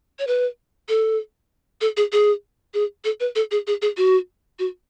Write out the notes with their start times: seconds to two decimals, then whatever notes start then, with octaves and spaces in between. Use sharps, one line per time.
0.19 C#5
0.27 B4
0.89 A4
1.81 A4
1.97 G#4
2.12 G#4
2.74 G#4
3.05 A4
3.20 B4
3.35 A4
3.51 G#4
3.67 G#4
3.82 G#4
3.97 F#4
4.59 F#4